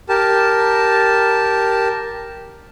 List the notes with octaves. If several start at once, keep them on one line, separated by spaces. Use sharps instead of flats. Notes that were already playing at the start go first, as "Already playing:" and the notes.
G4 A#4 A5